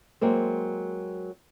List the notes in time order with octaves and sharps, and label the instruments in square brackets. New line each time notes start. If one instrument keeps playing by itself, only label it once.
[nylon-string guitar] F#3 G#3 A#3 C4